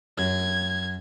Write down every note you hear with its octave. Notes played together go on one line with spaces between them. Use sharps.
F#2 G#6